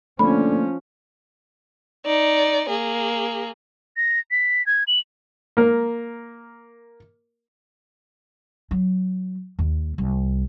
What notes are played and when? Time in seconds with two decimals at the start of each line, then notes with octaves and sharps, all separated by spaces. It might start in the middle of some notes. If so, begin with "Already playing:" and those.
0.19 D3 F3 A3 A#3 C#4 B5
2.06 D#4 D5
2.69 A#3 G#4
3.97 A#6
4.31 B6
4.66 G#6
4.88 F#7
5.57 A#3 A#4
8.71 F#3
9.59 D#2
9.98 C2